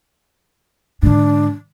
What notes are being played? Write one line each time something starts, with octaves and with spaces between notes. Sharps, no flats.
G#2 D3 D4